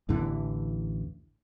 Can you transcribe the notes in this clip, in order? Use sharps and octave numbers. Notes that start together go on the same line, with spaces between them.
A1 E2 D3 E3